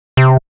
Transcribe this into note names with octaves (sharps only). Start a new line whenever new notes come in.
C3